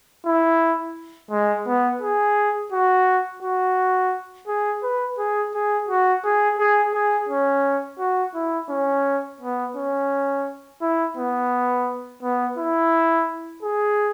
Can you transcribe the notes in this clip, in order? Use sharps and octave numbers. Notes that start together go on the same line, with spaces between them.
E4
G#3
B3
G#4
F#4
F#4
G#4
B4
G#4
G#4
F#4
G#4
G#4
G#4
C#4
F#4
E4
C#4
B3
C#4
E4
B3
B3
E4
G#4